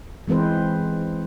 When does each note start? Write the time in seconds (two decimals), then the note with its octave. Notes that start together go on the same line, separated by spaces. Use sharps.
0.27 E3 G#3 C4 B4 C5